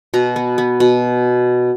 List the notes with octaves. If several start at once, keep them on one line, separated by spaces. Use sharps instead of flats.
B2 A#5
B3
B3
B2